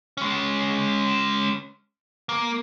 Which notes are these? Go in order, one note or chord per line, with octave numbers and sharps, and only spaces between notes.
G#3 C#4
A#3